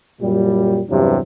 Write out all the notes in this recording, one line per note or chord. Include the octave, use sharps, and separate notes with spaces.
F#2 A#2 G3
E2 G2 C3 F#3